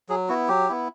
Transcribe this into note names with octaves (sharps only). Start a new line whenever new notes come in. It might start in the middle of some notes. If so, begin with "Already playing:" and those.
F#3 G#4
B3 E4 F#4
F#3 G4
B3 E4